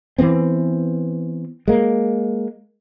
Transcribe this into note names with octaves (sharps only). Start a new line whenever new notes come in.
E3 F3 B3 C4
G#3 A#3